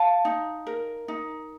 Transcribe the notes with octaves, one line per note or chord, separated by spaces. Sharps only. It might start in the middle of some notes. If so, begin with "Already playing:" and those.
Already playing: F5 A5
D#4
A#4
D#4